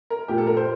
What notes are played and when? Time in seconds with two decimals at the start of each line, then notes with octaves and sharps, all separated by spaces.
0.10 A#4
0.28 A#1 A#2 A3 G4
0.38 A4
0.47 A#4
0.57 C5